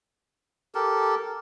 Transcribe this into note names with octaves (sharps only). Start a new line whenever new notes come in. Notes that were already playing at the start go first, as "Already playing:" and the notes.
G4 A4 A#4